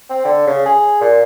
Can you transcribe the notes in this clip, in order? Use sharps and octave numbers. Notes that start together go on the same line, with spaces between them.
C4
D3
C#3
G#4
A#2